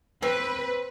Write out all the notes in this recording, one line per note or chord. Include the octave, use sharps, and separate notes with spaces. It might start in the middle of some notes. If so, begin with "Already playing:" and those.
C4 B4